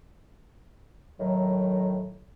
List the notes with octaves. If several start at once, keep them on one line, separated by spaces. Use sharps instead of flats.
A2 D#3 F#3